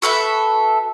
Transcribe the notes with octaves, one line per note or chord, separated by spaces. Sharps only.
F#4 A4 B4 E5